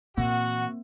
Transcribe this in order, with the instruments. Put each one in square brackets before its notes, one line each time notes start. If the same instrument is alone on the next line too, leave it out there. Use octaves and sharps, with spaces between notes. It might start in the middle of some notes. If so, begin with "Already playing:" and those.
[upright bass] A#2 E3 [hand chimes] A#3 C4 [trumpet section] F#4 [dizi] F#5